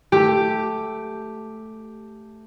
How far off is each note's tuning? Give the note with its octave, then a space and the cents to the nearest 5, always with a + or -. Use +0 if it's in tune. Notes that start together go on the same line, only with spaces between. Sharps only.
A3 +0 G4 +0